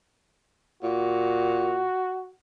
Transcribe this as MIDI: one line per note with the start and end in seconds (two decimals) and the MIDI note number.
0.83 1.86 46
0.83 2.31 66